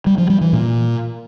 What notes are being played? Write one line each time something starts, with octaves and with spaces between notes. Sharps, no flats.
G3
F3
G3
E3
A#2